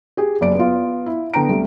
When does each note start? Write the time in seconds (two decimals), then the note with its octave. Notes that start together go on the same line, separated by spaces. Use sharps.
0.17 G4 G#4
0.41 F#1 D5 D7
0.55 B3 F4
1.06 E4
1.34 D3 B3 G5 A#5 D7
1.49 C2 G3 A3